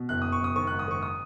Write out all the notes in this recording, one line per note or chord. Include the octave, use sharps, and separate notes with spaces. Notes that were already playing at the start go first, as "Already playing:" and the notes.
Already playing: B2
F#1 F#6
F#1 D#6
C#6
F#1 D#6
D#3 C#6
G#2 F#6
D#6
D#3 C#6
D#6